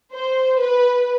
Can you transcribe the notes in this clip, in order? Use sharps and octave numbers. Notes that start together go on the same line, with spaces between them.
C5
B4